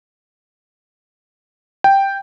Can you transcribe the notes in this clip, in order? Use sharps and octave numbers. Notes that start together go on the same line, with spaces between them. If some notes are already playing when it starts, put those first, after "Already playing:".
G5